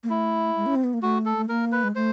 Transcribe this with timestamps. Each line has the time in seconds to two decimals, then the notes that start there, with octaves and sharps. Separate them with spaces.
0.03 A#3
0.09 A3 E4
0.56 G#3
0.66 C#4
0.75 C4
0.84 B3
0.94 A#3
1.02 A3 F#4
1.25 A4
1.37 A3
1.49 A#3 A#4
1.72 B4
1.84 G#3
1.95 A3 C5